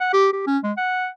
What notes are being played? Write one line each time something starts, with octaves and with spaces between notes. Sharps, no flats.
F#5
G4
G4
C#4
G#3
F#5